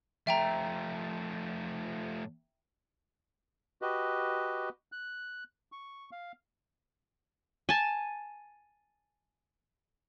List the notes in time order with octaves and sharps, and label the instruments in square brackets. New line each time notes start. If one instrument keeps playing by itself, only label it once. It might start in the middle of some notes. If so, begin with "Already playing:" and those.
[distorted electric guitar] F3 A3 [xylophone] E5 G5 A#5
[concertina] F#4 G4 B4 D#5
F#6
C#6
F5
[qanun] G#5 A5